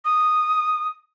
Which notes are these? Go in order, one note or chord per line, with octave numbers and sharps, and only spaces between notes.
D#6